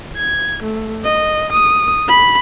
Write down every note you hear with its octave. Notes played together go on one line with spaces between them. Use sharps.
G#6
A3
D#5
D#6
B5